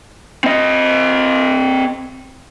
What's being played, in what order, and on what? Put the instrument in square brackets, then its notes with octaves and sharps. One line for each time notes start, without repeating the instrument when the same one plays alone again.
[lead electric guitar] C4 D#5